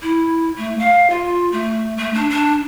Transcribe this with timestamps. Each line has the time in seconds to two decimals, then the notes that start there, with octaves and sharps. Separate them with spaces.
0.02 E4
0.57 A3
0.79 F5
1.10 F4
1.52 A3
1.97 A3
2.14 D4
2.30 D4